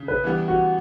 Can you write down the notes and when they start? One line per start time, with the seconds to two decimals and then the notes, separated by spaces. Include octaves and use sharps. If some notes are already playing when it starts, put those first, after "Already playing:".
Already playing: C#3
0.08 B4
0.24 E3 G3 B3
0.48 F#4